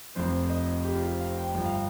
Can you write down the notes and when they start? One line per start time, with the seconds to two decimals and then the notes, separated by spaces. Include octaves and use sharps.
0.15 F1 F2 F3 C4 C5
0.50 D#5
0.85 G4
0.95 F4
1.02 G4
1.21 F5
1.38 G5
1.55 G1 G2 F3 G5
1.65 F5